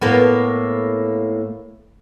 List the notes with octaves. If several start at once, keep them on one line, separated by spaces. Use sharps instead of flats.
A2 A#3 B3